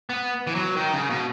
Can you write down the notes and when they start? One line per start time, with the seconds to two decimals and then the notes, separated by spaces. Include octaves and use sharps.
0.10 B3
0.47 E3
0.55 F#3
0.76 D#3
0.93 C#3
1.10 B2